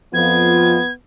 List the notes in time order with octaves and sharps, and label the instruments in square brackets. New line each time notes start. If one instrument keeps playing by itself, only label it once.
[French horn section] F2 F4 [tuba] F3 [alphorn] B3 [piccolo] G#6